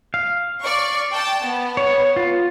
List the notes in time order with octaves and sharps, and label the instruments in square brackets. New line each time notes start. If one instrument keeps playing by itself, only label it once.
[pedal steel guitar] F5
[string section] D5 C#6
G5 A5
B3
[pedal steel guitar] C#5
F4